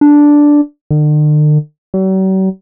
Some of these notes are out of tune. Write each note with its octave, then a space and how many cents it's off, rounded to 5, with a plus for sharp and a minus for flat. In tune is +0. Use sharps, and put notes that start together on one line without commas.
D4 -5
D3 +45
F#3 +45